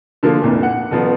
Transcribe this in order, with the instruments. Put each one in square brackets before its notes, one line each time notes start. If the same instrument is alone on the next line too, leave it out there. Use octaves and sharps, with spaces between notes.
[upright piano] D3 F3 A#3
F1 C2 A#2
F#5
D#1 F3 B3